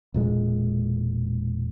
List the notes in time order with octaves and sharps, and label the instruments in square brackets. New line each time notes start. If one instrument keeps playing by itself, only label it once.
[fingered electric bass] E1 A#2 G#3